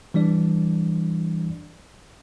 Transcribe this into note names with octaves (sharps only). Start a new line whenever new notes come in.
E3 G3 D4 D5